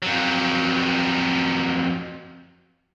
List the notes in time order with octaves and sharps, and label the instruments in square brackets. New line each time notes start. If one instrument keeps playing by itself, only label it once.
[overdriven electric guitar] F2 F#3